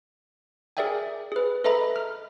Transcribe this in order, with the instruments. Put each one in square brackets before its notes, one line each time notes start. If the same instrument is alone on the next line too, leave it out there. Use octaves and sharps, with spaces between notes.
[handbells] G#4 A#4 D5 E5 G5 G#5
G#4 B4
A4 B4 D#5 E5 A#5 B5
F6